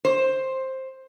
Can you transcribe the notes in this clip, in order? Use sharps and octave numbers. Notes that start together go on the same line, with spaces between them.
C5